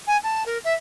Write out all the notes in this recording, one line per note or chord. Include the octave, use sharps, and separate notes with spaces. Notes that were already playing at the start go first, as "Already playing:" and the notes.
G#5
A5
A#4
E5